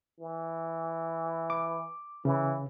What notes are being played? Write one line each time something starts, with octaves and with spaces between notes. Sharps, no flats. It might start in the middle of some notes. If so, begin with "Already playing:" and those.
E3
D6
C#3 E3